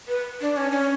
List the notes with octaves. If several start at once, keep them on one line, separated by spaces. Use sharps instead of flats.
B4
D4
C#4
C#4